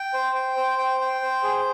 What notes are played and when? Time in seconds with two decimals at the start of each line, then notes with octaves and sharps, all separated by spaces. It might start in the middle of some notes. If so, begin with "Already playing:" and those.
Already playing: G5
0.14 C5
0.35 G5
0.57 C5
0.78 G5
1.01 G5
1.22 C5
1.43 G#4